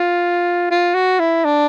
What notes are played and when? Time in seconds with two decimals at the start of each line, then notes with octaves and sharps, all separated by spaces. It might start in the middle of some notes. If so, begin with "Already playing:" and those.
Already playing: F4
0.71 F4
0.94 F#4
1.20 E4
1.45 D4